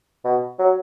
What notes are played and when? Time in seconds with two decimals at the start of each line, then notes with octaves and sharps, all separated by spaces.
0.25 B2
0.59 F#3